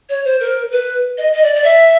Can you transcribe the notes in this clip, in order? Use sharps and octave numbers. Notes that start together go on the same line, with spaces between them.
C#5
C5
A#4
B4
D#5
D#5
D5
D5
E5